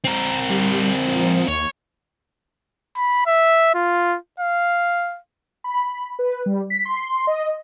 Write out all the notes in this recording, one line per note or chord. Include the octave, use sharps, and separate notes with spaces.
C4 A#4
G3
F3
D#2 C#5
B5
E5
F4
F5
B5
B4
G3
B6
C6
D#5